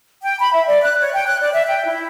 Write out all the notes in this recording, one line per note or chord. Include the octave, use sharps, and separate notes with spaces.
G5
B5
E5
D5
F#6
C#5
G5
F#6
D5
E5
G5
E4